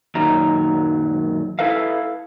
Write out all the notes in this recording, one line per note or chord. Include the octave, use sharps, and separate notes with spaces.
F#2 A#2 D#3 F#3 A#5
E4 F#4 A4 B4 E5 F5